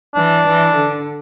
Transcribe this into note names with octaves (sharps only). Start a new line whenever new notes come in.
E3 D4
E3
D3